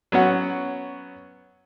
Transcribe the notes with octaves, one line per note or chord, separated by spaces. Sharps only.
F#3 B3 C#4 F#5